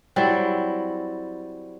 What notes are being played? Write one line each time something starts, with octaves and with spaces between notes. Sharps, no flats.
F#3 G3 C4 E4